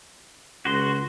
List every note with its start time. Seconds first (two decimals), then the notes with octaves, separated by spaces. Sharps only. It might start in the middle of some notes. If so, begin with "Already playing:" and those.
0.65 C#2 F#4 C6